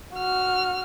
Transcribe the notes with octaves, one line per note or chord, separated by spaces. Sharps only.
F#4 F6